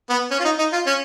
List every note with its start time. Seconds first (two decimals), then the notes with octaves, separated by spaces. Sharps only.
0.10 B3
0.31 C#4
0.40 F4
0.44 D#4
0.59 D#4
0.72 F4
0.87 C#4